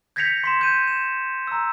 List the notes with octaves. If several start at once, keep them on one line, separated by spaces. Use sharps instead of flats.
G6 G#6 A#6 B6 C#7 F7
C6 B6 E7
G6 D#7
E7
A#5 E6